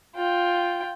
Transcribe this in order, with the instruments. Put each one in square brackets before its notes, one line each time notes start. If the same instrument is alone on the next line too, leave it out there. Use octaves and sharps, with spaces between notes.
[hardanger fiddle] F4 G5